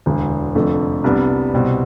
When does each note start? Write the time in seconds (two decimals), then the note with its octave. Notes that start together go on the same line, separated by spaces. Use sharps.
0.06 E1 D2 D3
0.55 F1 F2 D3 A3
1.04 C2 C3 G3 B3 D4
1.53 C2 B2 G3 C4